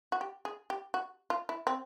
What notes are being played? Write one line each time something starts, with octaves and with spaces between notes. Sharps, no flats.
F#4
G4
G#4
G4
F#4
F4
E4
C4